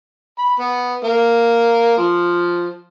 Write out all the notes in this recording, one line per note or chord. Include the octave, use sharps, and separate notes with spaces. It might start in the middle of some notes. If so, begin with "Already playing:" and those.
B5
B3
A#3
F3